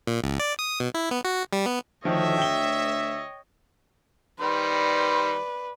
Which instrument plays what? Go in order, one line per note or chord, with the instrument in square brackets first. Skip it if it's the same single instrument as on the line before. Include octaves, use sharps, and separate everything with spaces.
[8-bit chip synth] A#2
C#2
D5
D#6
B2
E4
B3
F#4
G3
B3
[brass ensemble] D2 E5 [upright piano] D#3 F3 [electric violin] C#5 D#5
[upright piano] G5 G7
[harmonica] D#3 G3 C5 [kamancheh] B4 [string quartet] D5